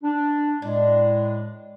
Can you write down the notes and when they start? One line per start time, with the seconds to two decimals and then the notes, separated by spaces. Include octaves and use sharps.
0.03 D4
0.62 A2 G#3 D4